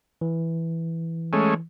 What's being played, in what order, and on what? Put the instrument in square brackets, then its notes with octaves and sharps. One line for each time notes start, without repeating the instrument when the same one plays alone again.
[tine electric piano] E3
[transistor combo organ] G#3 A3 C#4